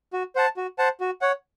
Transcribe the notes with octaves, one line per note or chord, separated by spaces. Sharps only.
F#4
C5 F#5 A5
F#4
C5 F#5 A5
F#4
C#5 F#5